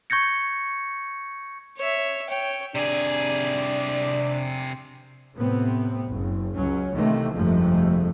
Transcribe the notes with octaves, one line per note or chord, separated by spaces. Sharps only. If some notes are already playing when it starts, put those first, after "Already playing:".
C#6 G6 G#6 A#6 C#7
C#5 E5
C#5 G5
C3 D4 G#4
A2 C3 B3 C4
F#1
C#2 F#3 C#4
C3 D#3 E3 A3 A#3 C4
G1 F2 C3 F3 G#3 A3